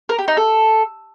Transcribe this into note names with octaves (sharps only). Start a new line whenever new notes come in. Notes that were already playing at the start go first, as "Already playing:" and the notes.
A#4
G4
D#4
A4